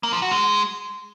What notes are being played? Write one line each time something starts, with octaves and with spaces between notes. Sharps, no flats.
A#3
F3
F#4
G#3